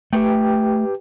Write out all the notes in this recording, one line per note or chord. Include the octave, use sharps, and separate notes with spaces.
A3 G4 B4 G5